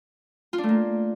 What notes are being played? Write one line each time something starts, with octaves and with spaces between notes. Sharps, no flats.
F4
D4
A3
A#3